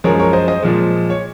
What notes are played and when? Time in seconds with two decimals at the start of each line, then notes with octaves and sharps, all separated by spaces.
0.04 F#2 F3 G#3 A#4 C#5
0.19 A#4 C#5
0.33 C5 D#5
0.48 C5 D#5
0.63 A#2 F3 G#3
1.10 C#5